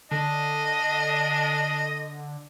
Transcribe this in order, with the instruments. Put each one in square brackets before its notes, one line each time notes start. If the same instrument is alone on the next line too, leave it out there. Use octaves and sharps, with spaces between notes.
[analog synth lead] D3 [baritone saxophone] D4 [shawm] D#5